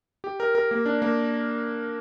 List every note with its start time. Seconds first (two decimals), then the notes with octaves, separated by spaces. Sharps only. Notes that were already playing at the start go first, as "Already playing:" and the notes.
0.24 G4
0.40 A#4
0.55 A#4
0.71 A#3
0.86 D4
1.02 A#3